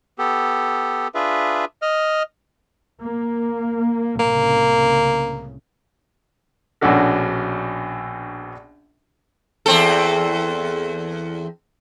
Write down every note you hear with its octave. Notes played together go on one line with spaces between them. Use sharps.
B3 G4 A4
D4 F4 G#4 B4 E5
D#5 F6
A#3
C2 A2 C#3 A#3
A#1 B2 C#4 D4 F#4 A4
E2 C4 A4